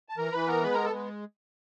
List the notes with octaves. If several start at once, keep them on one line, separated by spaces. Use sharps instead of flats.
A5
E3 A#4 A#5
E3 B4 B5
B3 A#4 A#5
G#3 B4 B5
B3 A#4 A#5
A4 A5
G#3